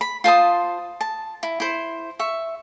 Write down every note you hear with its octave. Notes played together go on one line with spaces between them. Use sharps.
B5
F4 C5 A5 D#6
A5
E4
E4 C5
E5 C#6